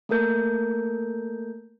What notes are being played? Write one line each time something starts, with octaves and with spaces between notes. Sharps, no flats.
A3 A#3 A4 A#4 G6